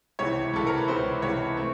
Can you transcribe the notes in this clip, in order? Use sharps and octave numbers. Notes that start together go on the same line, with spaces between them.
C#2 C3 E3 C#5
C#2 C3 E3 A4
A#4
B4
C#2 C3 E3 C5
C#2 C3 E3 C#5
A3 C4